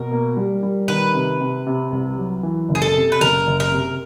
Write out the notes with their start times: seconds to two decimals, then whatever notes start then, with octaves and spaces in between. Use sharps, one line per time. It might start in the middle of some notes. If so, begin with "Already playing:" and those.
Already playing: B2 A#4
0.11 A#3
0.37 G3
0.63 G3
0.88 D#3 B4
1.14 C3
1.41 C3
1.67 C3
1.92 C2
2.18 F#3
2.43 E3
2.69 F#1
2.75 G#4
2.82 A4
2.96 C3
3.12 B4
3.21 F#1 A#4
3.47 F#1
3.60 A#4
3.72 C3